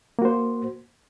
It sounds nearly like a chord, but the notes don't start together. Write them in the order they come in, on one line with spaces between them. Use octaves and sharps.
A#3 F#4 C5